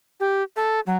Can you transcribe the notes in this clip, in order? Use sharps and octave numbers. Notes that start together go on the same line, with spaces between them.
G4
A4
F#3